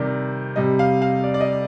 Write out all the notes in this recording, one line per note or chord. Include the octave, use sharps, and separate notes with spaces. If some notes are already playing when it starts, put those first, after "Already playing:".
Already playing: C3 D#3 G3 D5
C3 G3 D#5
F5
F5
D5
D5
D#5